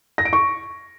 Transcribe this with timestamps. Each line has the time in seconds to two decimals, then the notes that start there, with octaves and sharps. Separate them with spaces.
0.18 A#6
0.25 D7
0.33 C#6